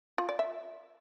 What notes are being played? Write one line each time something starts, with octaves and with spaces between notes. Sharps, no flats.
F4
D5
E5